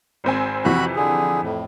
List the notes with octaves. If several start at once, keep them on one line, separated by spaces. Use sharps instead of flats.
G#1 C4 G#5
F2 C3 E3 F#4 B5 F#6
D3 G#4
F2 A2